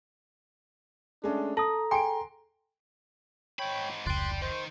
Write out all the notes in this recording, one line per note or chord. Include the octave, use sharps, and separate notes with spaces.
G#3 A3 C#4 D4
A4 A5 A#5 D#6 A#6
G#4 G5 G#5 C6 D7
G#2 C#5 G5 B5
F1 C#2 D5 G5 C6 F#6
D#3 C5